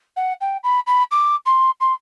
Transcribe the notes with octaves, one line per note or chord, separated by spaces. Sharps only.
F#5
G5
B5
B5
D6
C6
C6